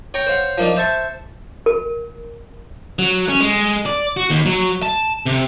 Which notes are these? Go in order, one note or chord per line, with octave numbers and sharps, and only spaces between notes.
C#5 G5 A#5 C#6
C5 C#5 F5 F#5
F3 A#3 D4 D#4
C5 E5 A5 C#6
A#4
F#3
C#4
G#3
D5
F#4
D#2
F#3
A5
C3